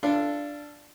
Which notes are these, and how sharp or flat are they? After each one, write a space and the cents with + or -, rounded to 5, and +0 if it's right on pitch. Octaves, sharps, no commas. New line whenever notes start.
D4 +0 F4 -25 A4 +0